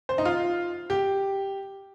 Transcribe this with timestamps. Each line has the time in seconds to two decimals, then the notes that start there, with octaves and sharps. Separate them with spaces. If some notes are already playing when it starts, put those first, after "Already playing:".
0.09 C5
0.18 D#4
0.25 F4
0.90 G4